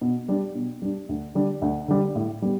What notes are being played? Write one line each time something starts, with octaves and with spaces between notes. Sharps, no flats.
B2
G3 D4
B2
G3 D4
D2
D3 G3 D4
D2
D3 G3 D4
A2
G3 B3